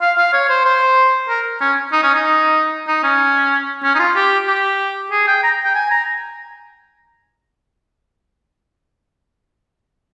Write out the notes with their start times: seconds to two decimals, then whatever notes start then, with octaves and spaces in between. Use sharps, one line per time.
0.01 F5
0.17 F5
0.33 C#5
0.49 C5
0.65 C5
1.29 A#4
1.61 C#4
1.92 D#4
2.03 C#4
2.14 D#4
2.87 D#4
3.03 C#4
3.83 C#4
3.95 D#4
3.99 F4
4.16 G4
4.47 G4
5.11 G#4
5.27 G5
5.43 A#5
5.64 G5
5.75 G#5
5.91 A#5